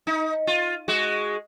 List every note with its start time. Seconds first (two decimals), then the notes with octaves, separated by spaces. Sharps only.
0.07 D#4
0.47 F4
0.88 G#3 F#4